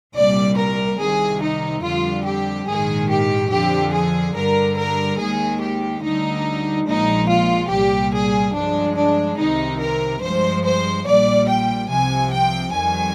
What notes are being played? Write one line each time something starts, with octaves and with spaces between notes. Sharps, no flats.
C2 A#2 G3 D5
A#4
C2 C3 D#3 G#4
D#4
F2 D3 G3 F4
G4
A#1 G#2 D#3 G#3 G#4
G4
F2 D3 F3 G4
G#4
G2 D3 G3 A#4
A#4
D#2 D#3 G#3 G#4
G4
D2 D3 G3 D#4
A#1 A#2 F3 G#3 D#4
F4
C2 A#2 G3 G4
G#4
G2 F3 G#3 D4
D4
C2 C3 D#3 D#4
A#4
G2 F3 G#3 C5
C5
A#1 A#2 G3 D5
G5
C2 C3 F3 G#5
G5
F2 D#3 G3 G#5